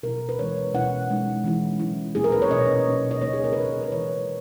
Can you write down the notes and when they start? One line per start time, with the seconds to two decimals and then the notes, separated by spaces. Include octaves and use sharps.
0.03 B2 F#3 C#4 E4 A#4
0.29 B4
0.39 E3 G#3 C#4 E4 C#5
0.73 B2 F#3 C#4 E4 F#5
1.10 B2 G#3 D#4
1.44 E3 G#3 C#4 E4
1.80 F#3 C#4 E4
2.15 A#2 A#3 C#4 E4 G#4
2.24 A#4
2.32 B4
2.42 C#5
2.50 B2 F#3 C#4 D#5
2.86 B2 A#3 D#4
3.11 D#5
3.21 C#3 F#3 A#3 D#4 C#5
3.33 G#4
3.44 A#4
3.53 B4
3.56 D#3 A#3 D#4 A#4
3.84 B4
3.91 E3 G#3 C#4 E4 C#5